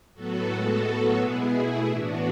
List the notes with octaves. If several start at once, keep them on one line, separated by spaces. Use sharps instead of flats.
A2 F#3 B3 F#4 A4
A2 G#3 B3 F#4 A4
A2 F#3 B3
B2 G#3 B3 E4 G#4
B2 A3
A2 E3 B3 D4 F#4